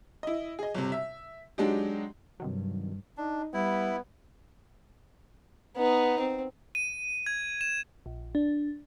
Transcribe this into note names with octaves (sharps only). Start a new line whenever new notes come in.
E4 D#5
G#4 D#5
G1 C3
E5
F#3 G#3 D4 D#4 G4
G2 C3 D#3 F#3
D4 D#4
G3 B3 E4
B3 D#4
C4
D#7
G#6
E7
A#1
D4